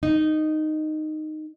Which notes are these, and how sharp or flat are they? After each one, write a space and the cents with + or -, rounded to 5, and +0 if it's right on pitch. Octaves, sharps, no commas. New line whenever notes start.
D#4 -10